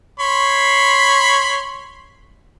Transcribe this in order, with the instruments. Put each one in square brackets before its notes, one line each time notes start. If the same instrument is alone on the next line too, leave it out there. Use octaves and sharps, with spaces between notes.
[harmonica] C#5 B5 C6